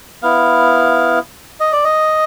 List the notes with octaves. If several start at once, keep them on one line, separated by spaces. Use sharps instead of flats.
B3 E4 F5
D#5
D5
D#5